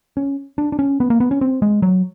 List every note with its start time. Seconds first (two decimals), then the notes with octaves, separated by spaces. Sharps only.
0.17 C#4
0.58 D4
0.72 D4
0.79 C#4
1.00 B3
1.10 A#3
1.20 B3
1.31 C#4
1.41 C4
1.62 G#3
1.82 F#3